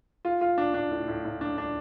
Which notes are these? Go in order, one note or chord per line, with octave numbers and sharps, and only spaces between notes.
F4
F4
D4
D4
A2
A2
A2
D4
D4